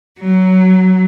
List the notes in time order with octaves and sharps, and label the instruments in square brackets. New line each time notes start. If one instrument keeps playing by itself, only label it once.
[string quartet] F#3